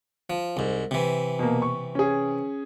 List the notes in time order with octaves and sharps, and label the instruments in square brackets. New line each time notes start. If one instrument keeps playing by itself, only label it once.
[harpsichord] F3
C2 G#2
C3 E3
[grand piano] B2 A#3
C#6
C#4 G#4